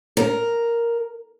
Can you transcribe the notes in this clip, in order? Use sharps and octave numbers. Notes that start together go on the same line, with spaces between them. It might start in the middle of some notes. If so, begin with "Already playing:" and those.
A#4